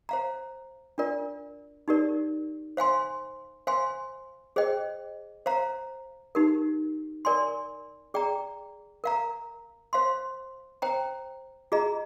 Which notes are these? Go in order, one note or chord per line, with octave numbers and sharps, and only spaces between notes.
C5 F5 A#5
D4 F4 A#4 D5
D#4 G4 A#4 D5
C5 F5 G#5 C6
C5 F5 G#5 C6
G#4 C5 D#5 G5
C5 F5 A#5
D#4 G4 A#4
A#4 D5 G#5 C6
G#4 D5 G5 A#5
A#4 F5 A#5
C5 F5 C6
C5 G5 A#5
F4 G#4 D#5 A#5